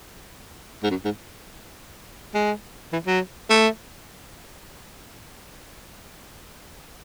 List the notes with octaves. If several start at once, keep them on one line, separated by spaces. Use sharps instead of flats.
G#2
F#2
G#2
G#3
E3
F#3
A3